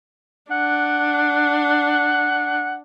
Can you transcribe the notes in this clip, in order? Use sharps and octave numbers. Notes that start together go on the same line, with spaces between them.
D4 F#5